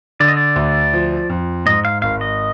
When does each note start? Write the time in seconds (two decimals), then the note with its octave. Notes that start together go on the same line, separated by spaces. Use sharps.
0.20 D3 D5
0.28 D#5
0.37 D5
0.56 D2
0.93 F3
1.29 F2
1.66 G#2 D#5
1.85 F5
2.02 G#1 F5
2.21 D#5